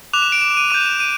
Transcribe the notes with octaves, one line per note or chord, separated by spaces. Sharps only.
D6 F#6 F7
E7
D7
E7
D#7
D6 G6 D#7
E7
D#7